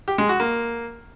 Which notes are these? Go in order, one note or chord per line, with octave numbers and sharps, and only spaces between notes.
G4
G#3
F#4
A#3